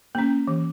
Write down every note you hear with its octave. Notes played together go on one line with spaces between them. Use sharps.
A#3 C#4
E3